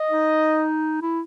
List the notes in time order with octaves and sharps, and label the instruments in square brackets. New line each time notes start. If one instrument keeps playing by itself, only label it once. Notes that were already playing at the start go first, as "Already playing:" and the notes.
Already playing: [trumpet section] D#5
[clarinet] D#4
E4